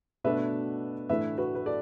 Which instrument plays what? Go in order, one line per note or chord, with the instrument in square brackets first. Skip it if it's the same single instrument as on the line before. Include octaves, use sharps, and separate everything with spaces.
[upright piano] B2 A3 D4 B4 E5
A2 E3 A3 D4 B4 E5
F#4 B4
B4
A4 D5